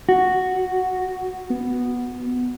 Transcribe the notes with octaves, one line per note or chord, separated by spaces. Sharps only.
F#4
B3